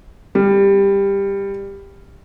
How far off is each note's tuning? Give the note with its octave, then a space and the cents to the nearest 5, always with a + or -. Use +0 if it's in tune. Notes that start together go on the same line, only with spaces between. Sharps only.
G3 +15